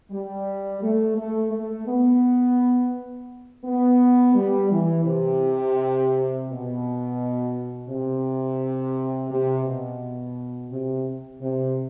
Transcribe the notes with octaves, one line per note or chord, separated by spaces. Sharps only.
G3
A3
A3
A3
B3
B3
G3
E3
C3
B2
C3
C3
B2
C3
C3